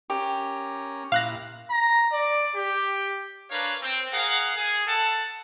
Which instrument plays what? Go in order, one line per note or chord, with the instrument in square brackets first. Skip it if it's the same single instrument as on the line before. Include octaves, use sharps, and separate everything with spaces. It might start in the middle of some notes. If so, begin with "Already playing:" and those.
[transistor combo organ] C#4 A#4 [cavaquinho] G4
[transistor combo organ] A#2 E4 [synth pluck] F5 F#6 A#6
[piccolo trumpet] A#5
D5
G4
[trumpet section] D4 A#4 B4 C#5 F5
C4
G#4 A#4 F5 F#5
G#4
A4 F#5 A5